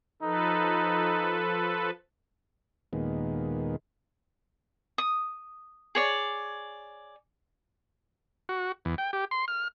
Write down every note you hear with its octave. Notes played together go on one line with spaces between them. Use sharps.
F3 D#4 A4 B4
D#2 A#2 D#3 G#3 B3
D#6
G#4 C#5 D5
F#4
E2
G5
G4
C6
F6